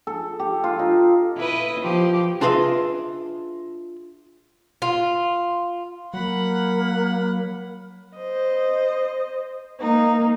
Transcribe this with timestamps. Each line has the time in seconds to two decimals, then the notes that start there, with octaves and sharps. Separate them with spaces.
0.07 A4
0.39 G4
0.64 F4
0.79 D#4
1.37 E4 B4 D#5
1.80 F3 G4
2.41 D4 F4 G#4 B4 D#5 E5
4.82 F4
6.14 F#3 A#3 F#5 B5
8.16 C5 D#5
9.79 A#3 D#4